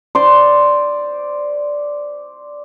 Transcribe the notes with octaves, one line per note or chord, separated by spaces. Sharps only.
C5 D5 C6